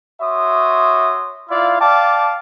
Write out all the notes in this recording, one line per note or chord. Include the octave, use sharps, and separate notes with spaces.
F#4 C#5 E5 C6 D#6
E4 F4 D5 F5
D5 F5 G5 A5 D6